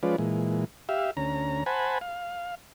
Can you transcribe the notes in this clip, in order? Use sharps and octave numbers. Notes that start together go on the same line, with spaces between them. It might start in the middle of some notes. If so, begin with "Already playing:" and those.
F3 G#3 C#4 F4 B4 D5
A#2 E3 G#3
G4 E5 F5
D2 C#4 A#5
C5 F#5 G#5 A5 B5
F5